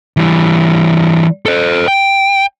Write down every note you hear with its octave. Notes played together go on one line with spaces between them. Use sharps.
E3 G3
A4 C5
G5